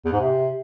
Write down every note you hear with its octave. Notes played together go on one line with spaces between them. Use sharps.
E2
G#2
C3